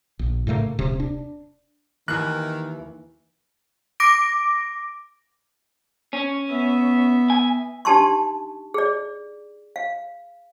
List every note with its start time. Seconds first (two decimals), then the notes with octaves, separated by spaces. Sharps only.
0.19 A#1
0.47 A2 C#3 A3 A#3
0.79 D#1 C3
1.00 D4
2.08 D#2 D#3 E3 E4 G#5 F#6
4.00 D6 A#6 D7
6.13 C#4
6.48 B3 E5
7.30 G#5
7.85 D4 D#4 G4 A5 C6 C#6
8.74 G#4 D5
9.76 F5